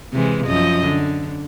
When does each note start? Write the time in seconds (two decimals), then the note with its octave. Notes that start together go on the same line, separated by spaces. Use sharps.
0.14 C3 E3 G#3
0.46 F#2 F3 D#5
0.85 D3